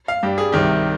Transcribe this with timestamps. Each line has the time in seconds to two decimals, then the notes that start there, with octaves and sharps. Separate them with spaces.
0.08 F5
0.23 G2 G3 G4
0.38 G#4
0.52 C2 C3 D#3 G3 G4